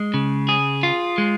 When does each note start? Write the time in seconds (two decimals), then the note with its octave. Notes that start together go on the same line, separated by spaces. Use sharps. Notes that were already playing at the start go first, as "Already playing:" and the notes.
Already playing: G#3
0.14 C#3
0.49 G#4
0.83 F4
1.18 G#3